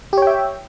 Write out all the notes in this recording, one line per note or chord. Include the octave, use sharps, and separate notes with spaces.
G4 C#5 E5 G5